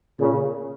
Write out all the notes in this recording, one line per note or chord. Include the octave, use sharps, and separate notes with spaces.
A#2 C#3